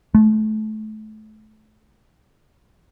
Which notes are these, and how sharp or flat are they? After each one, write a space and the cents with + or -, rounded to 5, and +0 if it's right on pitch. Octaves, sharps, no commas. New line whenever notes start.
A3 -30